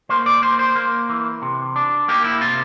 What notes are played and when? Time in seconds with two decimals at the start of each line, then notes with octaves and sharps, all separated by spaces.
0.09 A#3 C5
0.26 D5
0.42 A#3 C5
0.59 C5
0.76 A#3
1.09 E3
1.42 C3
1.76 D4
2.08 A#3 G4
2.24 E4
2.41 C3 F4